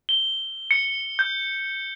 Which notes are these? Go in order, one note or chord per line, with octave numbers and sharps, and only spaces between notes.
G7
C#7
G6